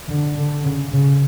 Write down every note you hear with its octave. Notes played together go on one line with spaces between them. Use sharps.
D3
D3
C#3
C#3